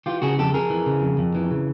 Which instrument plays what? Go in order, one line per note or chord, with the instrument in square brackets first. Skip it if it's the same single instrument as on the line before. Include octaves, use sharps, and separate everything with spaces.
[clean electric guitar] E3 F4 G4
C#3 F#4 G#4
F2 G4 A4
F2 G#4 A#4
E3
C#3
F2
F2
E3
C#3